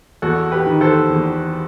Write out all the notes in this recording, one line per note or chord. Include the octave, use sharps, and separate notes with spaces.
E2 F#4 A4
G4 B4
D#3
A4 C5
E2